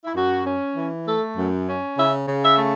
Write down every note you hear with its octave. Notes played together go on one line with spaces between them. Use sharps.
E4
F#2 F#4
C#4
E3
A3 A4
F#2
C#4
C#3 E5
C#3
E5
A3